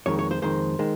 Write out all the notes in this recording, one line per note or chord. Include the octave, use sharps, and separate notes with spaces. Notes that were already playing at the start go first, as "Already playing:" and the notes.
F2 D#3 G#3 C#5
C#5
C5
F2 D#3 G#3 C5
D#3 G#3